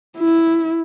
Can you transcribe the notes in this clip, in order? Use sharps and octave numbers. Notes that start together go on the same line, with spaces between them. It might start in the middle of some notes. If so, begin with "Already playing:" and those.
E4